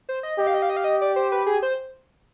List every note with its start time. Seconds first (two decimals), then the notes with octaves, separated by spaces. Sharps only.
0.09 C5
0.23 D#5
0.39 G4 D#5
0.47 F5
0.54 D#5
0.62 F5
0.70 D#5
0.77 F5
0.84 D#5
1.01 D5
1.16 C5
1.32 B4
1.47 G#4
1.62 C5